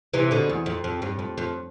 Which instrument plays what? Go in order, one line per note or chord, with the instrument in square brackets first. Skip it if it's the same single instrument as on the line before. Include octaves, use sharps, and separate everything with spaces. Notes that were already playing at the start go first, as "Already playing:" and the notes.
[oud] C3 E3
B2 D3
E2
F2
F2
G2
F2
F2